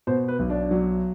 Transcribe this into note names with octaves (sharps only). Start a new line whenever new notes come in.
B2 C5
B4
B1
D4
F#3